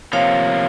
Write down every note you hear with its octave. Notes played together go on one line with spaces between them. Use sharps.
C3 F3 A#3 C#5 F5